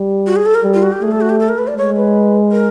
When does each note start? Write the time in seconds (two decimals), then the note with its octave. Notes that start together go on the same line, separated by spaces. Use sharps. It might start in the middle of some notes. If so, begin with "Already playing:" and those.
Already playing: G3
0.26 F#4
0.36 G#4
0.45 A4
0.54 A#4
0.64 G3
0.73 F4
0.82 F#4
0.92 G4
1.02 A3 G#4
1.11 A4
1.21 F#4
1.29 G4
1.39 A4
1.48 A#4
1.58 B4
1.67 D5
1.76 G#3 C#5
1.96 B4
2.52 A#4